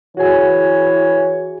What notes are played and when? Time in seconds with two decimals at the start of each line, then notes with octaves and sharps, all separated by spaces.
0.17 E3 F#4 G#4 C#5 G#5